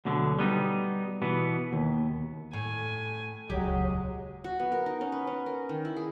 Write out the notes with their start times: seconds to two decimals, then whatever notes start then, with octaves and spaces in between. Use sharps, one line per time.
0.05 D2 B2 D3 F#3
0.39 G3 B3 D#4
1.22 B2 E3 B3
1.73 D#2
2.53 A2 G#5
3.50 D#1 C#2 F#3 G#3 D4 G4
4.44 F#4
4.60 B3
4.72 A#4
4.86 D#4
5.01 C#4
5.12 B4
5.27 C#4
5.46 A#4
5.69 D#3
5.85 E4
5.96 G#4